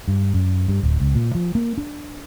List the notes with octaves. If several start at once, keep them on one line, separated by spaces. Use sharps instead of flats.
G2
F#2
G2
D1
C#2
A#2
F3
A#3
D4